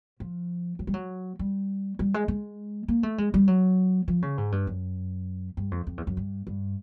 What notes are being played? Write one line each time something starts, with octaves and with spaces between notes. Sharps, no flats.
F3
F#3
G3
F#3
G3
G3
G#3
G#3
A#3
A3
G#3
G3
F#3
F3
C#3
G#2
G2
F#2
G2
F2
F2
E2
F#2
G2
G2